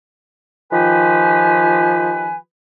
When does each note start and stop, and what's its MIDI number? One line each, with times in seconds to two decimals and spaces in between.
0.72 2.37 51
0.72 2.37 53
0.72 2.37 65
0.72 2.37 67
0.72 2.37 71
0.72 2.37 80